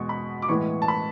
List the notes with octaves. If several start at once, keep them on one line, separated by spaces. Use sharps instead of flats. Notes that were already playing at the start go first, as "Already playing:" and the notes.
Already playing: E2 B2 G#3 C#6
B5
D6
A2 E3 G#3 B3 E4 C#6
A5
B5